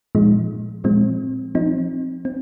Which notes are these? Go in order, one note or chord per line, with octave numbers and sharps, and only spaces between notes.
A#2 F3 G#3 D#4
A#2 F3 G#3 C4
F3 C4 D#4
C4